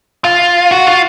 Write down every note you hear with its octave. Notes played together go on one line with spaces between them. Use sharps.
F4
F#4
F4